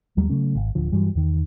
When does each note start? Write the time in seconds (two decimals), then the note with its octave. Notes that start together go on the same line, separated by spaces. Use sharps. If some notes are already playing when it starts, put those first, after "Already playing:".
0.17 D#2 F#3 G3 A3
0.29 C#3 F#3 A3 C#4
0.55 G#1
0.75 D1 D3 F3
0.92 G2 E3 F#3 G3
1.15 E2 D#3